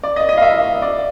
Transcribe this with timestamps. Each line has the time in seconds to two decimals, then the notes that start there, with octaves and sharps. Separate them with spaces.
0.03 D5
0.16 D#5
0.29 D#5
0.37 F5
0.42 E5
0.82 D5